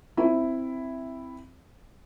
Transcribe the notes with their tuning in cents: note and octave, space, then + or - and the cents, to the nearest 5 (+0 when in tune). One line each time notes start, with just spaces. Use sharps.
C4 +0 E4 +0